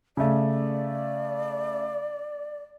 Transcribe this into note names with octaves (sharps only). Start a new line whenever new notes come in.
C#3 A3 D5